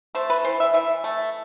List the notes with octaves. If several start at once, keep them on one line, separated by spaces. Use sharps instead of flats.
A3 C5
B4
E3 C5
E5
E3 E5
A3